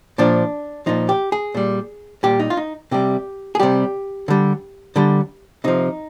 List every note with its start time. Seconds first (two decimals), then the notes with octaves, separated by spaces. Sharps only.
0.18 A#2 F3 D4
0.86 A#2 F3 D#4
1.09 G4
1.32 G#4
1.55 A#2 G3
2.23 A#2 G3 G4
2.40 D#4
2.50 F4
2.57 D#4
2.91 C3 G3 G4
3.55 G#4
3.60 C3 G3 G4
4.28 D3 G3
4.96 D3 G3
5.64 C3 F3 D#4